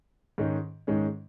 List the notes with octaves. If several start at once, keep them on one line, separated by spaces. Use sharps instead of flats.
G#2 D#3 G#3 C#4
G#2 D#3 G#3 C#4